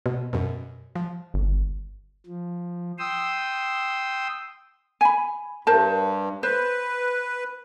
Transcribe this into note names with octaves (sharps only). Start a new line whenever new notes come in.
B2
F#2 B2
F3
G1
F3
G5 C6 D#6 E6
G#5 B5
G2 A#4 C5 A5
B4 C5